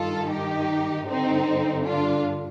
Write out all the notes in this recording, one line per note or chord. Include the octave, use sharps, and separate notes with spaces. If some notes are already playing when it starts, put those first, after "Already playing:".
Already playing: G2 D#3 F4 A4
D#4 G4
G2 D3 C4 D#4
D4 F4